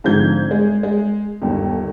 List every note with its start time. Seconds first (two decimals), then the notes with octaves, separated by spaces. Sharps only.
0.04 G#1 G#2 D3 F3 G6 G#6
0.51 G#3
0.83 G#3
1.42 G1 D#2